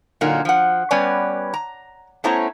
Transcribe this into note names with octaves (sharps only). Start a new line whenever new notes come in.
A#2 D3 F#3 A#3 D#4
F3 F#5
G3 B3 C#4 B4 D5 G#5
A#5
A3 B3 C#4 E4 C5 A#5